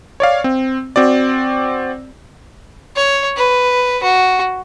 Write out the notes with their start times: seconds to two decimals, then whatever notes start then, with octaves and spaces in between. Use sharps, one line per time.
0.20 C#5 D5 F5
0.44 C4
0.96 C4 F#4 D5
2.96 C#5
3.37 B4
4.03 F#4